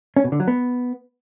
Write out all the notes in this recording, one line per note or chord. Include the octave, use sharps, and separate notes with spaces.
C#4
B2
D3
F#3
B3